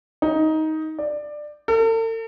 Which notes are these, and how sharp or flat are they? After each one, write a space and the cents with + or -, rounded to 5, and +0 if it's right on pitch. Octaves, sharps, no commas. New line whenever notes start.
D#4 +15
D5 +15
A4 +45